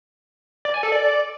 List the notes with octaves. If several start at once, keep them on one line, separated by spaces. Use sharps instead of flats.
D5
G#5
A4
D5